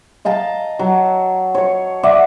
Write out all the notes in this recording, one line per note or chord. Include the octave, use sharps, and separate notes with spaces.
D#5 F5 A5 A#5
F#3
C#5 C#6
D5 E5 F#5